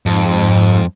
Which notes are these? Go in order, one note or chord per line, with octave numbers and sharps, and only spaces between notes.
F2 G#2